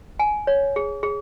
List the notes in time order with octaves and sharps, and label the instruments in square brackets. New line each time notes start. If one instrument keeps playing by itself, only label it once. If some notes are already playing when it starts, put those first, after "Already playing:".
[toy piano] G#5
C#5
G#4
G#4